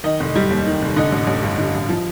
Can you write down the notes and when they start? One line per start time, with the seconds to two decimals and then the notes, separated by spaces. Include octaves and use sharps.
0.04 D#3 D#5
0.20 F1
0.35 G3
0.50 D#2
0.66 D#3
0.82 F1
0.96 D3 D#5
1.12 A1
1.27 A1
1.43 G2
1.58 D3
1.74 A1
1.89 F3